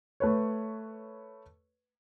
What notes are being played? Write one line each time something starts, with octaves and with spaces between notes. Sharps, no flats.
A3 B4 C#5